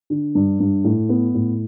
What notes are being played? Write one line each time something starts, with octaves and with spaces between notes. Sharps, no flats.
D3
G2
G2
A2
B3
A2